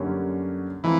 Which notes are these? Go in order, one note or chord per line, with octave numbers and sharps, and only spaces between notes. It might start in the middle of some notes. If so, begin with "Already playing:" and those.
Already playing: F#2 D3 G3 A#3 C#4
E3 F3 A3 C4 D#4